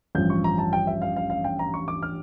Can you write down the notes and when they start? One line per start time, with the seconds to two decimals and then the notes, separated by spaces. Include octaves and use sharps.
0.15 A1 G2 F3 G6
0.30 C#6
0.44 A#5
0.58 A5
0.73 G5
0.87 E5
1.02 F5
1.16 F5
1.30 F5
1.44 G5
1.59 A#5
1.74 C#6
1.88 D6
2.03 F6